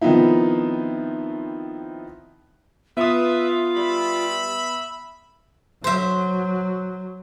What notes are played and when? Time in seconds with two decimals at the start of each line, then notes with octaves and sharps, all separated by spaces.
0.01 D#3 F3 B3 C4 D#4 E4
2.97 B3 F4 B4 E5 D#6
3.76 G3 E5 B5
5.84 F#3 C5 E5